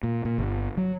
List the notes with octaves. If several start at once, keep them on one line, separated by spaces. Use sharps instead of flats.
A#2
A#2
G1
F#3